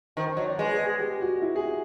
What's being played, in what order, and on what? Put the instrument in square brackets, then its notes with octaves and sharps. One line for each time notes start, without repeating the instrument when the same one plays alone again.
[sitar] D#3 [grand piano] C5
[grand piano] C5
[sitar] F#3 [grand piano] C#5
[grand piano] D5
[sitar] G#3 [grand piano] B4
[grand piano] G#4
G#4
G4
F#4
E4
G#4